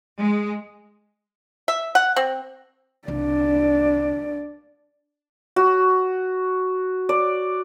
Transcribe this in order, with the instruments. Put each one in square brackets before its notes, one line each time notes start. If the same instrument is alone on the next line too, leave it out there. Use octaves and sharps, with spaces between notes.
[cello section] G#3
[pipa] E5
F#5
C4
[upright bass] C2 [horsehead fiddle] D4 D5
[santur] F#4
D5